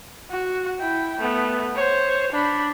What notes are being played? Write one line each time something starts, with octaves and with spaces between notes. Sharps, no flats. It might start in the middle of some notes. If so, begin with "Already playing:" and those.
F#4
E4 G5
A3 B3
C5 C#5
D4 B5